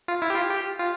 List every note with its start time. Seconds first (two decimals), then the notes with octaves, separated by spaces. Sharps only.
0.08 F4
0.22 E4
0.30 G4
0.36 F4
0.51 G4
0.79 F4